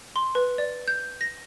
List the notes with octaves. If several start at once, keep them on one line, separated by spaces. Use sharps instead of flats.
C6
B4
D5
G6
A#6